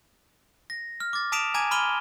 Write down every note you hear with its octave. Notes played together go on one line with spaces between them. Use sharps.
A#6
F6
D6 A6
A5 D#6 B6 D7 E7 F7
G#5 A#5 D6 G#6 D#7
B5 C6 F6 D#7 G7